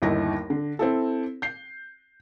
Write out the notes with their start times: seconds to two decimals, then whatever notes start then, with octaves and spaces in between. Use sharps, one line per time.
0.02 G1 D#2 D#4 E4 A#6
0.50 D3
0.79 C4 E4 A4
1.42 G6 C7